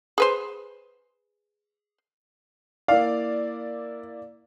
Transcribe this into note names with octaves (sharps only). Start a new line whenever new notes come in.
G#4 B4 C5
A#3 E4 D5 F5